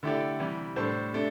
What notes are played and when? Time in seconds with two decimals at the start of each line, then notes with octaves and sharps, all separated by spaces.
0.03 D3 A3 E4 G4 D5
0.40 C3 E3 G3
0.76 A2 G3 D4 A4 C5
1.13 C3 A3 D4